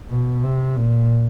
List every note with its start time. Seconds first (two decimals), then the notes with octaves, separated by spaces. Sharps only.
0.10 B2
0.43 C3
0.76 A#2